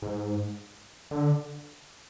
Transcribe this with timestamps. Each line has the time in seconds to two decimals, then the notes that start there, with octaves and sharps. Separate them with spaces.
0.02 G#2
1.11 D3